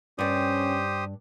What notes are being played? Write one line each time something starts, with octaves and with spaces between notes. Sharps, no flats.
G2 C#4 G4 C5 D5 D#6